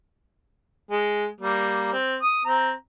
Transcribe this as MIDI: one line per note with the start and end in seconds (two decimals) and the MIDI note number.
0.91 1.26 56
1.41 1.92 55
1.41 1.92 58
1.93 2.16 60
2.22 2.41 87
2.45 2.72 60
2.45 2.72 82